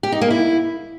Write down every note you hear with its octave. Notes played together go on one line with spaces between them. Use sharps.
G4
D#4
A#3
E4